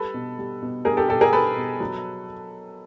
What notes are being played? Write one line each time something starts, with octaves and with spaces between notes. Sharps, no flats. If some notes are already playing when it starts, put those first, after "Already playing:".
Already playing: G3 A4 B4
B2
G3
B2
G3 G#4 A#4
G4 A4
B2 G4 A4
G#4 A#4
G3 A4 B4
B2
F#3